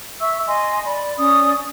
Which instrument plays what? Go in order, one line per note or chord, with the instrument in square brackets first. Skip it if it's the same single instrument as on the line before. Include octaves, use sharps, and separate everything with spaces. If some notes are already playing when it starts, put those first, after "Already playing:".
[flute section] E5 C#6 E6
D#5 G#5 C6
D5 B5
C#4 D5 D#6